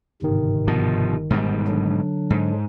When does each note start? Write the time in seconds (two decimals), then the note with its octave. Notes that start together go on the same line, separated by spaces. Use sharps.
0.22 G1 G#2 C3 D#3
0.67 B2 F3
1.30 G#2 B2 G3
1.68 D3 F#3 D4
2.30 G#2